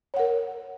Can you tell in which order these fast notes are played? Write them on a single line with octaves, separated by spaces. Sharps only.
C#5 F#5 A#4